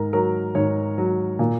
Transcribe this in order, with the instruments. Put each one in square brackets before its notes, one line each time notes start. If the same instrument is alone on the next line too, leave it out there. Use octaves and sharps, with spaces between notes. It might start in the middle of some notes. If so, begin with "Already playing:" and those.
Already playing: [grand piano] G#2 A#4
F#3 A#4
G#2 C#5
F#3
A#2